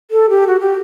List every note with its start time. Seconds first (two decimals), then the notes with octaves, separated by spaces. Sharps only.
0.11 A4
0.30 G4
0.47 F#4
0.60 G4